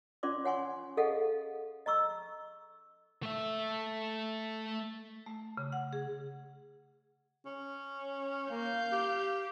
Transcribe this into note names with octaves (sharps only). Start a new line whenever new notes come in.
C#4 F4 D5 C6 D6
C#5 F#5 G#5 C6 C#6
G#4 A4 D#5 F5 F#5
D#5 A#5 C#6 E6
A3 E5
A3
C#3
F#5
G#4
C#4
A#3 F5 G6
G4